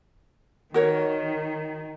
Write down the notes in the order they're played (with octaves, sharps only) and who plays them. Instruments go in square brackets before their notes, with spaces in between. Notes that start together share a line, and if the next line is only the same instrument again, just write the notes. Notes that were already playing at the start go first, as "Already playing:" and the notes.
[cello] D#3 [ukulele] F#4 A#4 C#5